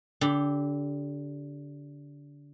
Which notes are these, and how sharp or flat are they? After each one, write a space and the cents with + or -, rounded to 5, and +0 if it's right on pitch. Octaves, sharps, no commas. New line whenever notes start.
D3 -25 G4 +0